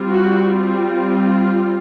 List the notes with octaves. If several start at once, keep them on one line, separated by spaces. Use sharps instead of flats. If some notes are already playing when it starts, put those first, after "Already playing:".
Already playing: G3 C4 F4
F#4
F4